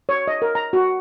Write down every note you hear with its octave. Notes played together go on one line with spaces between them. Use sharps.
C#5
D#5
A#4
A#5
F#4